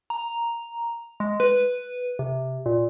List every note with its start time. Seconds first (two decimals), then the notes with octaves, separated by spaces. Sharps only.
0.10 A#5
1.20 G#3
1.40 B4
2.19 C3
2.66 A#2